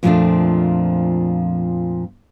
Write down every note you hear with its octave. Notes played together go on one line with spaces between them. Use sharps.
F2 A#2 F3 G3 A3 D4